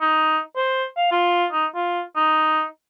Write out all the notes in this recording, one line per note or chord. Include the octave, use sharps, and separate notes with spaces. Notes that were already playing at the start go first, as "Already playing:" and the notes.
D#4
C5
F5
F4
D#4
F4
D#4